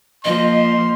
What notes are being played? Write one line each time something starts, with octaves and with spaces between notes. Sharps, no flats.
F3 A#3 D#5 C6